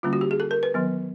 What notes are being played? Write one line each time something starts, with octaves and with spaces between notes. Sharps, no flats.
D3 G3 A#3 C#4 F4
F#4
G4
G#4
A4
A#4
B4
D#3 F#3 B3